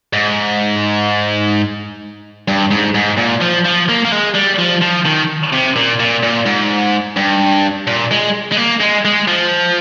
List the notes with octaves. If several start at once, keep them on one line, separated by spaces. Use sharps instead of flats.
G#2
G2
G#2
G#2
A#2
F3
F3
A#3
A#3
G#3
G3
F3
F3
D#3
C3
A#2
A#2
A#2
G#2
G2
A#2
G#3
G#3
A#3
G#3
G#3
F3